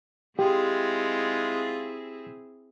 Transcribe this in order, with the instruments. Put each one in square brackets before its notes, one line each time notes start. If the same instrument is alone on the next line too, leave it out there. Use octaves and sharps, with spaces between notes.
[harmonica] G#3 F4 [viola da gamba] C4 E4 G#4 [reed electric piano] G4